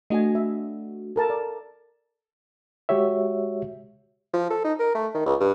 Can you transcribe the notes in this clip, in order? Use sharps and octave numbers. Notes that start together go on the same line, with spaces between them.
A3 D4 F#4 D#5 G#5
E5
A4 A#4 A5
D5
G#3 F#4 G4 C#5 E5
F3
A4
D#4
A#4
A3
D#3
C#2
G2